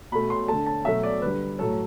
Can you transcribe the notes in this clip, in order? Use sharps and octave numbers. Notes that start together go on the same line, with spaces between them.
B2 A3 B5
C6
D3 A3 A5
A5
B2 F#3 A3 E5
D5
D3 G3 B4
A2 F#3 A3 A4